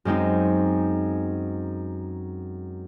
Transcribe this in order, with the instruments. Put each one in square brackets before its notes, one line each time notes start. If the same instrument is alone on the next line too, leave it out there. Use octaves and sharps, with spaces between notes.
[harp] F#2 G#3 C4 D#4